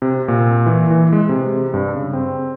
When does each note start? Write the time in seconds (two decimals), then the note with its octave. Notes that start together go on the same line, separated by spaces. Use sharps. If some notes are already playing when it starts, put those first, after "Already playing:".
0.02 C3
0.28 A#2
0.66 E3
0.91 E3
1.13 G#3
1.29 C3
1.74 G2
1.96 C#3
2.13 C4